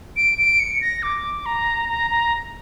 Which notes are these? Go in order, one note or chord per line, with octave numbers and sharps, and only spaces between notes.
D7
D7
C#7
A#6
D6
A#5
A#5
A#5